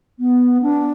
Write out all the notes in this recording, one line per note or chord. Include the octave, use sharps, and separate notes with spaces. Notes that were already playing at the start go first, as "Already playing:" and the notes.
B3
D4